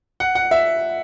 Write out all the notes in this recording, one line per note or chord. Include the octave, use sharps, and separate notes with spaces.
F#5
F#5
E5